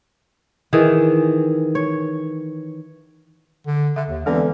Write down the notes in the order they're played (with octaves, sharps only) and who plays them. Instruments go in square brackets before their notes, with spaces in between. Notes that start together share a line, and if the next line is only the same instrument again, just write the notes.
[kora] D#3 E3 G#4
C#5
[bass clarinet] D3
[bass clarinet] D3 [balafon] E5
[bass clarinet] D#2
[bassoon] D3 [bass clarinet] E3 [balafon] G#3 B3 C4